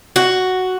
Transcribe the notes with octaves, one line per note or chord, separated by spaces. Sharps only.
F#4